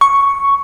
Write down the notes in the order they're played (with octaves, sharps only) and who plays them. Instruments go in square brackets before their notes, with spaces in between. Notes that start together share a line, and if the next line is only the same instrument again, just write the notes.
[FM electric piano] C#6